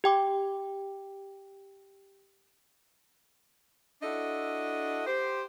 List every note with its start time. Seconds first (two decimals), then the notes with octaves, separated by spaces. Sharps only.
0.04 G4 G5 D6
4.02 D4 E4 F#4 A4 D#5
5.06 G4 C5